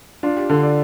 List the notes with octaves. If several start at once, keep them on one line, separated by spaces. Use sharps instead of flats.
D4 F4
G4
D3 A4
D5